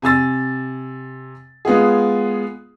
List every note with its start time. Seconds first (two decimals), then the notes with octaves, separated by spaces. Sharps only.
0.02 C3 G#5 E6 A6
1.65 G#3 B3 F4 G#4